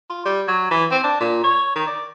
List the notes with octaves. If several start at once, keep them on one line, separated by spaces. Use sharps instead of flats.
F4
G3
F#3
E3
C4
D4
A#2
C#5
D#3
D5